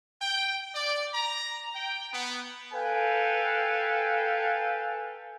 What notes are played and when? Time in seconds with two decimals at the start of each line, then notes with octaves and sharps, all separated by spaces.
0.21 G5
0.74 D5
1.13 A#5
1.75 G5
2.13 B3
2.74 A4 B4 F5 G5 G#5